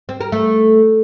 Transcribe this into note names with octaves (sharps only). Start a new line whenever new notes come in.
C4
A#4
A3